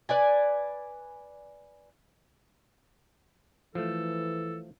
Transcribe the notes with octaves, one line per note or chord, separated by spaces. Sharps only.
B4 D5 G#5
E3 F3 A3 A4